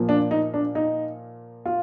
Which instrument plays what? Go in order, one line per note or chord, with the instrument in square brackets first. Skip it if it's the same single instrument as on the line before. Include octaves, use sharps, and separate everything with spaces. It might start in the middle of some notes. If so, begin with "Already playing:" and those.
Already playing: [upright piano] A#2 F3 A#3
D4
D#4
D4
D#4
F4